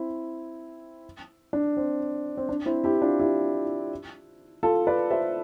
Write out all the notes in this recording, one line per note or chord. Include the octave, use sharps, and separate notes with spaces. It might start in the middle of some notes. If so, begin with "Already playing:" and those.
Already playing: C4 E4
D4
C4
C4
D4
C4 E4
E4 G4
D4 F4
E4 G4
F4 A4
B4 D5
C5 E5